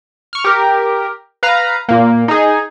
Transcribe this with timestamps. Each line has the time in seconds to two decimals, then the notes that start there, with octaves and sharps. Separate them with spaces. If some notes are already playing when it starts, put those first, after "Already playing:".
0.33 C#6 F6
0.44 G4 A#4
1.43 B4 F5 A#5
1.89 A#2 A#3
2.28 D#4 G#4